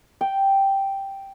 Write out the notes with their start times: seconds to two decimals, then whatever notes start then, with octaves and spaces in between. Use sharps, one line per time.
0.21 G5